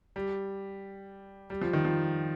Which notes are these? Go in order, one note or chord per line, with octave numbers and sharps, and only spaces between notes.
G3
G3
F3
D#3
F3